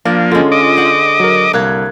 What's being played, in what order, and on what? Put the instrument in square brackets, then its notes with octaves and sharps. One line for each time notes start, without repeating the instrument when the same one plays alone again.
[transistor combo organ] F3 A#3 [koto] D4 [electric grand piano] F5
[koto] D3 G#3 [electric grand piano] C#4 F4
[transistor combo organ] D#5 D6
[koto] C5 F#5
[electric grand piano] F#3 A#4
[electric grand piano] C2 F#6 G#6 [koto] A#3